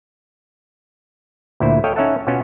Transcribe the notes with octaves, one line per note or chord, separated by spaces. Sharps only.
D2 A#2 E4 C5
A4 C#5 D#5 F5 G5
C#4 D#4 C#5 E5 F#5 A5
B2 B3 C#4 F4 F#4